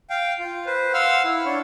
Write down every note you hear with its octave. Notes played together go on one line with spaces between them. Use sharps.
F5 G5
F4
B4 C5
F5 F#5 C6 E6 F6
E4
D4 C#5